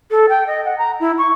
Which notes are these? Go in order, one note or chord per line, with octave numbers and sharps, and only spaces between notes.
A4
G5
D#5
F#5
A#5
E4
C#6